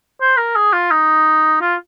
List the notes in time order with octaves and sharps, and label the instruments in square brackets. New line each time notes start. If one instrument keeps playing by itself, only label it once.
[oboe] C5
A#4
G#4
F4
D#4
F4